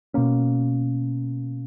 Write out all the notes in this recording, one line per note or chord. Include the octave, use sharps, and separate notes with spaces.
B2 A#3 C#4